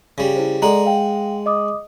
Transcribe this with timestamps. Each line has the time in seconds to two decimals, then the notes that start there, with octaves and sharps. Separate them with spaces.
0.18 C#3 G3
0.36 E4 C5
0.62 G#3 A4 D5 F#5 A#5
0.86 F5 G5
1.46 D#5 D6 D#6